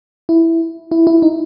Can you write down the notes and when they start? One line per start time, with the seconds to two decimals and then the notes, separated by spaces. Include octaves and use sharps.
0.29 E4
0.92 E4
1.07 E4
1.22 D#4